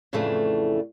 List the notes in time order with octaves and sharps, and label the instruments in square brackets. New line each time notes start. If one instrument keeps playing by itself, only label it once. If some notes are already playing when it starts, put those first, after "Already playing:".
[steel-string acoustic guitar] F2 A2 C#3 E3 A3 D4